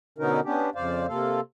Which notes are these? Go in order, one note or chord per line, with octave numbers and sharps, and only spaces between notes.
B2 D3 B3 C#4 D#4 A#4
B3 C#4 D4 G4
F2 C#3 C5 D5 F5
C3 A#3 F4 A4 F5